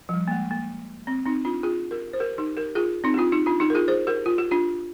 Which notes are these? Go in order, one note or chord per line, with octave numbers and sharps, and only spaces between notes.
F3
G3
A#3
G#3
A#3
C4
C4 D#4
D4 F4
F4 G#4
G4 A#4
C5
G4 A#4
D#4 G4
G4 A#4
F4 G#4
C4 D#4
G4
D4 F4
D#4 G4
D4 F4
D#4 G4
A#4
F4 G#4
G#4 C5
G4 A#4
F4
G4
D4 F4